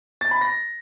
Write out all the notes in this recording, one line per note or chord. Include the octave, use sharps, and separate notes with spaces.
A6
B5
A#6